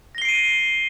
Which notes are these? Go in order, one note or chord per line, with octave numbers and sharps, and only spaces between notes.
A#6 C7 D7 D#7 G7